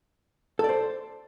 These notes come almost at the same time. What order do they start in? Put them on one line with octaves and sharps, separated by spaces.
A4 D5 C5